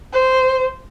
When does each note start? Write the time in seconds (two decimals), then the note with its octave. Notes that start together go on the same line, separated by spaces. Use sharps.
0.13 C5